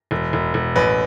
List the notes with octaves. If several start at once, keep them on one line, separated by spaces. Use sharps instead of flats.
E1
E1
E1
A1 B4